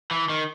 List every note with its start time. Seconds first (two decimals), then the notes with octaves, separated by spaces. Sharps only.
0.11 E3
0.29 D#3